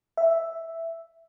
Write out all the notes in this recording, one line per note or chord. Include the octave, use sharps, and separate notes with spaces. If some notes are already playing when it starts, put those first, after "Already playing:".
E5